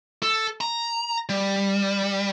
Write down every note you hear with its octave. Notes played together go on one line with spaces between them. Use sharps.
A4
A#5
G3